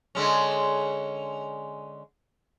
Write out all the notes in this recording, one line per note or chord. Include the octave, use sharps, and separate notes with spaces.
D3 G#3 C#4